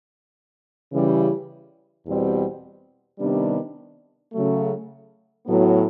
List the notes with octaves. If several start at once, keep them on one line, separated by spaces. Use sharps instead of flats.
C#3 E3 G3
E2 B2 G3 C4
C3 D#3 G3 B3 D4
C#3 F#3 A3
A2 F#3 B3